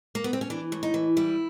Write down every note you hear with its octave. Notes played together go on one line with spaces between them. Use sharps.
A#3
B3
C4
C#4
E3 D4
A2
D#4
E3
G3 E4